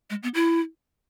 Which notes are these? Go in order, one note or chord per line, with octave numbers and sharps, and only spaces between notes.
G#3
B3
E4